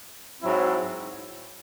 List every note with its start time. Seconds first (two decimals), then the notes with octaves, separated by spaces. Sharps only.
0.41 G#2 F#3 C4 E4